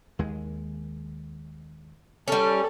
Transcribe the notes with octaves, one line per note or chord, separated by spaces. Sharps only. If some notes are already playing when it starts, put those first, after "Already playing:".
D#2 G#3
G3 C#4 A4